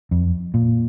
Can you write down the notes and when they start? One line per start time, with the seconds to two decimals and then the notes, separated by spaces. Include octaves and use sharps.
0.11 F2
0.54 A#2